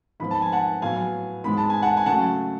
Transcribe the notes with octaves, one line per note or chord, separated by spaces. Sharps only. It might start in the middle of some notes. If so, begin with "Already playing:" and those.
G#2 F3 B3 B5
A5
G#5
F#5 A5
A2 F#3 B3 F5 G#5
G#2 G#3 B3 B5
A5
G#5
F#5 A5
G#5
C#3 F#3 A3 F#5 A5